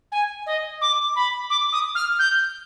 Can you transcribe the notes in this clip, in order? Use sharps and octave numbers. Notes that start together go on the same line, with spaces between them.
G#5
D#5
D6
B5
D6
D#6
F6
G6